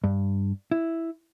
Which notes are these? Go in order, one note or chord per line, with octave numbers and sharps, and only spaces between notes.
G2
E4